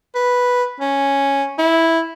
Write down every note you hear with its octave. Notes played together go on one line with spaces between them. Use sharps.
B4
C#4
E4